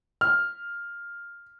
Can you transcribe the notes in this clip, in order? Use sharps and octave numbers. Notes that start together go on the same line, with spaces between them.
F6